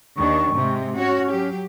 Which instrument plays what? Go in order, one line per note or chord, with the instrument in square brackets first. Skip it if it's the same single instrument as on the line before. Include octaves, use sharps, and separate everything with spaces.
[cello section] D#2 D#3 D4 [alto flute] C#6
[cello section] G#2 C3 G#3
[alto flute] C#4 [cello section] F#4 C#5
[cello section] F#3 G4